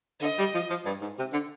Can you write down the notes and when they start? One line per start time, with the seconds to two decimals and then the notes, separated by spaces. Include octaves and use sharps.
0.22 D3 D#5
0.38 G3
0.54 F3
0.69 F3
0.86 G2
1.01 G#2
1.17 C3
1.33 D3